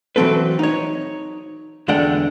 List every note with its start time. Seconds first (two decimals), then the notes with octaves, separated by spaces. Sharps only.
0.16 E3 F#3 C4 A4 B4
0.59 D#4 C#5
1.88 E2 D3 G#3 D4 F#5 G5